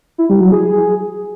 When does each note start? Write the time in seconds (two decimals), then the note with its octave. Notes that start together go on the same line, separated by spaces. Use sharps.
0.18 E4
0.30 G3
0.41 F#3
0.52 G#4